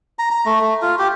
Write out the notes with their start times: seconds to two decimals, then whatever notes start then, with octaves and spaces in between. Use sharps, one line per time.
0.19 A#5
0.31 A#5
0.46 A3
0.61 A3
0.82 F4
0.99 G4